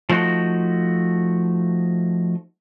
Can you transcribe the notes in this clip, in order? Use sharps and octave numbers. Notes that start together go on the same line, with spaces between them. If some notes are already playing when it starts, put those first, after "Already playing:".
F3 A3 D#4 F#4